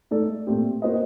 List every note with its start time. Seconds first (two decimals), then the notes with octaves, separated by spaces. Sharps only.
0.11 A3 D#4 A4 D5
0.47 A#2 A3 C4 G4
0.82 A#3 F#4 C5 D#5